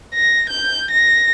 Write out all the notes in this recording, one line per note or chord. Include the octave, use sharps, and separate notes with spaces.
A#6
G6
A#6